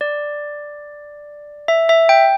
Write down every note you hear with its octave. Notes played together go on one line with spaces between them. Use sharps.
D5
E5
E5
G5